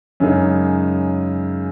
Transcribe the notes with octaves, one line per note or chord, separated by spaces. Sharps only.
F#2 C#3 G#3 D#4 G#4